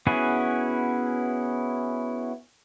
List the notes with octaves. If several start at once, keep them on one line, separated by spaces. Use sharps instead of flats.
B3 C#4 E4 F#4 G#4